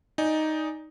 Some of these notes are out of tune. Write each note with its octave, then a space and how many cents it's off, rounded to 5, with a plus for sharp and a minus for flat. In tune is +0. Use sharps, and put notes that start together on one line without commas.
D#4 +0 D5 +0 G#5 +0